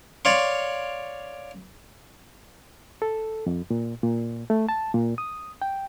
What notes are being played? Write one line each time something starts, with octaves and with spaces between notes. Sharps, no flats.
C#5 D5 F5 C6
A4
F2
A#2
A#2
A3
A5
A#2
D#6
G5